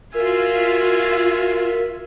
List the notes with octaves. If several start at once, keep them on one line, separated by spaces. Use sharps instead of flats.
F4 F#4 A#4 E5 G#5